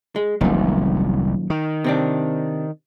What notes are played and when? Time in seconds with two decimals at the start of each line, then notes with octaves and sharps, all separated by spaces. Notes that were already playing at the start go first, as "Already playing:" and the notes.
0.16 G#3
0.41 F1 C2 F#2 A#2 D#3
1.50 D#3
1.84 C3 C4 D4